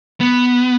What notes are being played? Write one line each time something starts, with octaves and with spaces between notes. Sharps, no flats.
B3